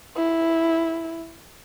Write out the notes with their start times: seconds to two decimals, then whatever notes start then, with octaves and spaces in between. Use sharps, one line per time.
0.16 E4